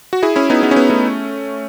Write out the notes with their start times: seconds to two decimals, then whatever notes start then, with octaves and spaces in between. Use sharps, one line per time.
0.13 F#4
0.23 E4 G#4
0.36 C#4 E4
0.50 B3 D#4
0.63 B3
0.71 C#4
0.76 B3
0.90 A3 C#4